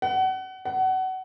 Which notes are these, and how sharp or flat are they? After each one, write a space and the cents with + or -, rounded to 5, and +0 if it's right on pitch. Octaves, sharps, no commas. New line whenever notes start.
F#5 +30
F#5 +25